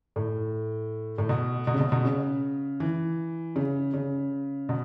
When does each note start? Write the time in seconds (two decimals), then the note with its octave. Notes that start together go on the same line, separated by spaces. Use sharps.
0.16 A2
1.18 A2
1.29 B2
1.67 B2
1.74 C#3
1.80 B2
1.92 B2
2.05 C#3
2.80 E3
3.56 C#3
3.94 C#3
4.69 B2